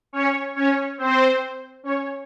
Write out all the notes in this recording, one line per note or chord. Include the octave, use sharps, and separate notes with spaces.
C#4 C#5
C#4 C#5
C4 C5
C#4 C#5